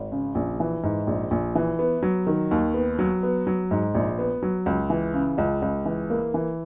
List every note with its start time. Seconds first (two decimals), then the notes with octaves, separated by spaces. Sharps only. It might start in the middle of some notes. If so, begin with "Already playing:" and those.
Already playing: G#1
0.12 C#3
0.35 A#1
0.60 E3
0.83 G#2
1.07 A#1
1.31 A#1
1.55 E3
1.79 B3
2.03 F#3
2.27 D#3
2.51 D#2
2.74 B3
2.99 F#3
3.23 B3
3.47 F#3
3.71 G#2
3.95 A#1
4.19 B3
4.42 F#3
4.66 C#2
4.90 E3
5.14 C#3
5.38 C#2
5.62 C#2
5.86 E3
6.10 A#3
6.34 E3